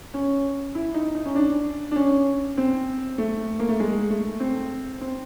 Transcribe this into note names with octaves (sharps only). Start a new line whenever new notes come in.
C#4
E4
D#4
D#4
C#4
D4
D4
C#4
C4
A3
A#3
A3
G#3
A3
C4
C4